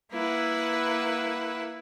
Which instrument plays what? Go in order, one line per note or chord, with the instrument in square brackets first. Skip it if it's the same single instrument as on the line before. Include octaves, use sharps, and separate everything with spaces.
[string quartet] A#3 E4 B4 F#5